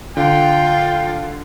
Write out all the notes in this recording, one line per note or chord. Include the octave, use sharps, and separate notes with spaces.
D3 F4 G5